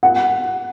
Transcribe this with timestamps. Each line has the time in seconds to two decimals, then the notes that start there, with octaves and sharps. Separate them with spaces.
0.03 F#5